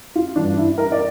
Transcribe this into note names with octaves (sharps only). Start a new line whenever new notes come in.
F4
G2 E3 D4
E4
A#4
D5